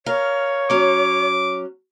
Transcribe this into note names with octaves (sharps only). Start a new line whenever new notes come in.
A#4 C#5 F5
F#3 C#4 D6